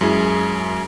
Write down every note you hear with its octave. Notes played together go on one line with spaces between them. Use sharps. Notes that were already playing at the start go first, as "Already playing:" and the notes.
F#2 G#3 E4 G#4